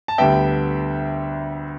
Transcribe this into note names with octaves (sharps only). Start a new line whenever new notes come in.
A5
D2 D3 G3 B3 E5 G5